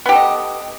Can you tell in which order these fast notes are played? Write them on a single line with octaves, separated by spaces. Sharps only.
B3 G4 A4 D#5